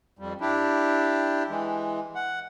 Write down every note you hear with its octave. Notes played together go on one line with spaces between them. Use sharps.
F2 G3
D4 E4 G4
E3 G#3
F#5